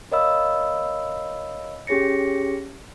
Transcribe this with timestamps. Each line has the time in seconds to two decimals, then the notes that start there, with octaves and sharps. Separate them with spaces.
0.12 A#4 C#5 D#5 F5 B5 E6
1.87 C#4 G4 G#4 C#5 A#6 C#7